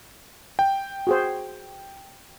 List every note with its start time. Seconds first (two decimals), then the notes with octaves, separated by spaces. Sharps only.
0.59 G5
1.07 F#4 G#4 C5